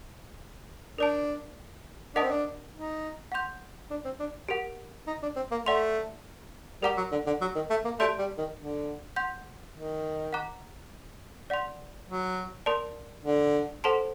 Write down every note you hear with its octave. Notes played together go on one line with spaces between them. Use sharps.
D4 A#4 D5 A5
D4 A#4 D#5 F#5 A5 D#6
C4
D4
D#4
F#5 C6 G6
D4
C4
D4
G4 A#4 F#5
D#4
D4
C4
A#3
A3 D5 F#5 C6
G3 A#4 F#5 A#5 D6
F#3
D3
D3
F#3
D#3
A3
A#3
A3 G4 D5 A5 C6 G6
G3
D#3
D3
F#5 C6 G6
D#3
F#5 A#5 D6 F#6
D5 F#5 C6
F#3
A#4 D5 A5 C6
D3
A4 C5 F#5 A5 C6